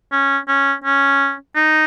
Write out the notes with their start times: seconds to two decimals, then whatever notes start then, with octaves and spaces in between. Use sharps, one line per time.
0.12 C#4
0.48 C#4
0.84 C#4
1.56 D#4